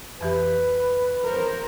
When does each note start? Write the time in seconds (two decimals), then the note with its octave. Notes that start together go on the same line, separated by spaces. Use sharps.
0.21 F2 E3 G4 B4
1.25 A#4 C5